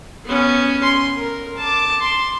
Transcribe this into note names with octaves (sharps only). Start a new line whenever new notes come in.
B3 C#4
C6
A#4
A5 D6
C6